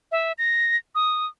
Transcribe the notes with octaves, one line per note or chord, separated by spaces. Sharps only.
E5
A#6
D#6